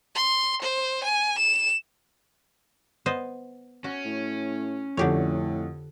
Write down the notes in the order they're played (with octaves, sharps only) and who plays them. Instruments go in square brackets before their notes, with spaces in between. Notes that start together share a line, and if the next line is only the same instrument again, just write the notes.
[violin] C6
C5
G#5
E7
[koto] B3 C5 D#5
[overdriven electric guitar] C#4 [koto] F#4
[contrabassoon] A2
[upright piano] F2 F#5 [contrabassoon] A2 [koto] D3 G4 C#5